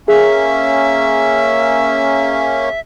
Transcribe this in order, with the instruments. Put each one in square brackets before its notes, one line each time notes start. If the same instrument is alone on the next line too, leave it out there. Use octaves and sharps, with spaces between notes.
[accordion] A#3 C#4 [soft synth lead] G#4 [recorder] E5